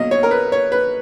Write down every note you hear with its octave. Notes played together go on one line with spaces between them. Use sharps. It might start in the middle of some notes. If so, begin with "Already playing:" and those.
Already playing: B2 F#3 A#3 D#5
C#5
A#4
B4
C#5
B4